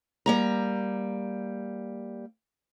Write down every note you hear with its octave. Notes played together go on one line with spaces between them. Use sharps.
G3 A#3 A#5